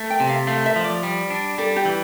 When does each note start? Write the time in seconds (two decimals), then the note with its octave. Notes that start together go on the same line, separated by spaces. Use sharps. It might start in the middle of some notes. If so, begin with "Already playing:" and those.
Already playing: A3
0.10 G5
0.20 C3
0.29 F5
0.47 A3 F5
0.66 E5
0.76 F3
0.84 D5
1.03 G3
1.30 D4
1.58 G3 A4
1.76 G4
1.85 E3